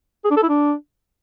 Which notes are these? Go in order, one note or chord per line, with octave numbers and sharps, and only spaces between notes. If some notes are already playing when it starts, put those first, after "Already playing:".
G#4
D4
A4
E4
D4